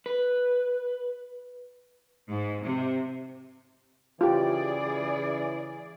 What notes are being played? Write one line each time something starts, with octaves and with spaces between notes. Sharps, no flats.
B4
G#2
C3
C#3 E3 F4 G4 G#4 D5